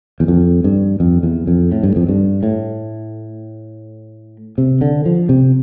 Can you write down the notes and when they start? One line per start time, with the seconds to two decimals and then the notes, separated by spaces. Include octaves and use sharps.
0.20 E2
0.28 F2
0.64 G2
1.00 F2
1.23 E2
1.47 F2
1.72 A2
1.83 G2
1.96 F2
2.08 G2
2.43 A2
4.58 C3
4.81 D3
5.06 F3
5.29 C3